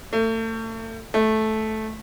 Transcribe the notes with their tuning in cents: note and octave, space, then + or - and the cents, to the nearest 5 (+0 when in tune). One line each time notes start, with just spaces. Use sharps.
A3 +35
A3 -10